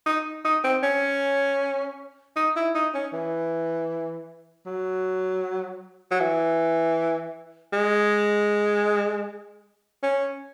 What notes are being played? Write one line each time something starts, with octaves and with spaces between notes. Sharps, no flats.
D#4
D#4
C4
C#4
D#4
E4
D#4
C#4
E3
F#3
F#3
E3
G#3
C#4